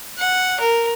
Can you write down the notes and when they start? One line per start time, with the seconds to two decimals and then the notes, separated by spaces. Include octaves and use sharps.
0.18 F#5
0.60 A#4